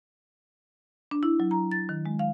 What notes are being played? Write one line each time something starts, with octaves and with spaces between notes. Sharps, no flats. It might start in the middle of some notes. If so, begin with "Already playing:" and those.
D4
E4
F#3
A#5
A6
D#3
G#3
F5